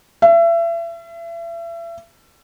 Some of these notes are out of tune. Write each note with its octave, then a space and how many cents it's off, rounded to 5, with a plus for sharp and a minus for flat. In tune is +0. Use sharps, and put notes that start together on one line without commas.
E5 +35